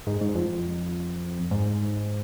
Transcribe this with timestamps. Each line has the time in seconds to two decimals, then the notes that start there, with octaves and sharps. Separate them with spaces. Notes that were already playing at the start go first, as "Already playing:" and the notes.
0.07 G#2
0.21 G#2
0.35 F2
1.51 G#2